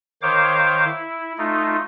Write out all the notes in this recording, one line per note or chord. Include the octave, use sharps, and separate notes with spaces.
D#3 C5 C#5 F5 D6
E4
A3 D#4 F4